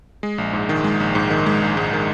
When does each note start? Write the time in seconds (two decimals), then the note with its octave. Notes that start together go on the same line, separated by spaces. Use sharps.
0.23 G#3
0.38 A#1
0.53 G#2
0.69 D#3
0.84 G#3
1.00 A#1
1.15 G#2
1.30 D#3
1.47 G#3
1.62 A#1
1.77 G#2
1.93 D#3